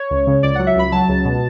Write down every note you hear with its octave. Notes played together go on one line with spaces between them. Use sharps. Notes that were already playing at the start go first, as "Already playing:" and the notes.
Already playing: C#5
C#2
C#3
C#2 D5
F#3 F#5
E5
C#2 B5
F#3 A5
C#2
B2